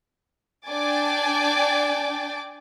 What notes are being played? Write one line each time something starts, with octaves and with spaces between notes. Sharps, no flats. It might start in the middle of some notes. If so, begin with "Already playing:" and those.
D4 D5 G5 G#5 D6 A6